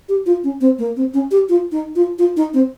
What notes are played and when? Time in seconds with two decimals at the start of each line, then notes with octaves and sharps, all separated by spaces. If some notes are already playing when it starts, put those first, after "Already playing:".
0.09 G4
0.26 F4
0.44 C#4
0.61 C4
0.78 A#3
0.96 C4
1.14 C#4
1.31 G4
1.49 F4
1.72 D#4
1.96 F4
2.19 F4
2.37 D#4
2.54 C4